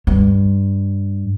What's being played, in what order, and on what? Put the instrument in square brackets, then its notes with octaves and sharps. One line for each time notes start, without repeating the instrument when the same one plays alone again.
[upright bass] G2